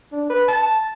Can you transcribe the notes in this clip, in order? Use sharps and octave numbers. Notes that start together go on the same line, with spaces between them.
D4
B4
A5